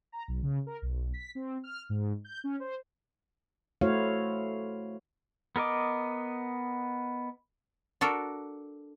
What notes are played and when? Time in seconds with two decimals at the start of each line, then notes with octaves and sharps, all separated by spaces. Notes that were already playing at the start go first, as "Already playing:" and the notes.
0.12 A#5
0.28 B1
0.43 C#3
0.67 A#4
0.82 B1
1.14 B6
1.35 C4
1.64 F6
1.89 G#2
2.25 G6
2.44 C#4
2.60 C5
3.81 A3 E4 F#4 C5 C#5 F5
5.56 B3 A#4 D#5 D6
8.01 D4 F#4 A4 A#4